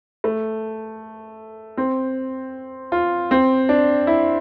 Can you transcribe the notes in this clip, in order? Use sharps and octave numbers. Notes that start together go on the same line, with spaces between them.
A3
C4
F4
C4
D4
E4